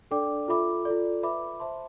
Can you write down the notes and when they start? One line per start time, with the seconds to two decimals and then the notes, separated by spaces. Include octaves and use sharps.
0.11 D4 A4 D5 G5 D6
0.48 F4 A4 E5 B5 D6
0.85 F4 A4 D5
1.23 B4 E5 B5 D6
1.60 C5 E5 A5 C6